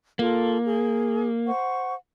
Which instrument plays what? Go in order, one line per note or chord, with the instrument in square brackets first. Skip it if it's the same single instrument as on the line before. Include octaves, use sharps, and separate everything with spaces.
[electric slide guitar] A#3 [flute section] F4 A4
[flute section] G#4
C5 F#5 C#6